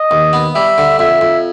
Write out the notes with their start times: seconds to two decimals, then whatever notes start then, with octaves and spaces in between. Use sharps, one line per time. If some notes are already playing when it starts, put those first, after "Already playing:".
Already playing: D#5
0.11 D#2
0.33 B3
0.55 G3 E5
0.78 D3
0.99 F2 E5
1.21 F2